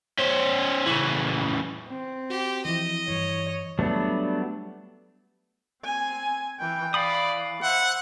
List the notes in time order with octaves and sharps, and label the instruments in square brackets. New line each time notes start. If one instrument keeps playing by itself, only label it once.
[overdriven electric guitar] C#4 C5
C#3 E3
[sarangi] C4
[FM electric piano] F#4 [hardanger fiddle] G4
[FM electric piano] E3 F3 E4 [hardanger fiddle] D#5
[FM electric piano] G2 E3 [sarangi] C#5
[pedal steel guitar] F#3 G3 A3 B3 D4
[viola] C4 G#5
E3 G5
[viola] E3 [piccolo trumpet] D5 [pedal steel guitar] F5 B5 D#6
[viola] C5 E5 [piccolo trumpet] F#5